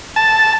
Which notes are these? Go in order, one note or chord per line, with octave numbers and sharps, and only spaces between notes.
A5